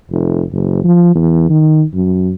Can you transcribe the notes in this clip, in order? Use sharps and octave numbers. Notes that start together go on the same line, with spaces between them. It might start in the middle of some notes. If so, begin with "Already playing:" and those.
F1
F#1
F3
E2
D#3
F#2